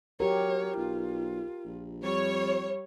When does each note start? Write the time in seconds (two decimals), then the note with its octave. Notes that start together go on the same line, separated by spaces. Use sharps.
0.20 F#3 G4 A#4 C#5
0.77 B1 F4
1.65 A#1
2.04 F2 G3 C#5